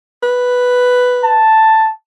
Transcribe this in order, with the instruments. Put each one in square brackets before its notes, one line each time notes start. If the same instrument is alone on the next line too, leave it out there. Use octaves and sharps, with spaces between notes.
[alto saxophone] B4
[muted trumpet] A5